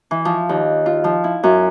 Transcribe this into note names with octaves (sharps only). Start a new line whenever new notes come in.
E3
F3
D#2
F4
F3
E4
F#2